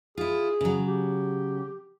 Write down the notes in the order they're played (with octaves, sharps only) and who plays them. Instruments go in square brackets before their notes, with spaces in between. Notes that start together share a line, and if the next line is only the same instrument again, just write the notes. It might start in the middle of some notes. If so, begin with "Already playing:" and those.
[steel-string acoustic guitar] E4 F4 [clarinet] G#4
[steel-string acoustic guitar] C#3 F#3
[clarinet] G4